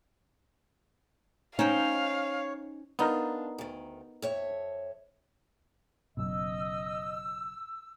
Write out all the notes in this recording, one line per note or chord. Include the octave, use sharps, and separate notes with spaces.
C#4 D#4 C5 C#5 F5 G5
B3 D4 D#4 F4 A#4
D2 D#3
F2 C#5 E5
F#1 F#2 B2 D#5 E6